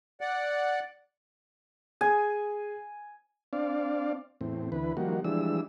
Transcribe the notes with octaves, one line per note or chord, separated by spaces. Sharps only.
D5 F#5
G#4 G#5
C4 D4 D5 F5
E2 A2 C4
D2 E3 B4
D#3 F3 G3 A#3 F#4
E3 F3 G3 G#3 D4 E6